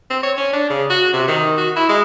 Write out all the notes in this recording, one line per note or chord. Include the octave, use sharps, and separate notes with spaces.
C4
C#5
C#4
D4
C#3
F#4
C3
D#3
F#4
E4
G#3